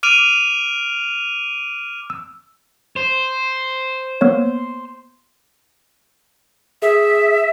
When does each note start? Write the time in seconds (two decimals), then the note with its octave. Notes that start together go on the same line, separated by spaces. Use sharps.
0.03 D6 F6 D7 D#7 F7
2.10 E6
2.96 C5
4.21 A#3 B3 C#5
6.82 G#4 E5